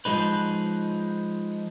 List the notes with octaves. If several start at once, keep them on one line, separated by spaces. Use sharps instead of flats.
F3 G#3 D#4 B4